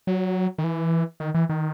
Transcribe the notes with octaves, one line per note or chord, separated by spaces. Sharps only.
F#3
D#3
E3
D#3
E3
D#3